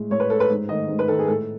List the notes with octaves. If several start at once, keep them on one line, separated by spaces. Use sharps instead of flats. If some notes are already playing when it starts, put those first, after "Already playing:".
Already playing: A2 G#3
A2 C#5
B4
G#3 A4
B4
G#2
D#3 A3 D#5
G#2
B4
D#3 A3 A4
G#4
A2 A4